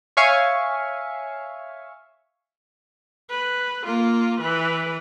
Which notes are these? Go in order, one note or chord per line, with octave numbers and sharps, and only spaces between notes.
C#5 E5 F5 G#5 C#6
B4
A#3 F4
E3 B4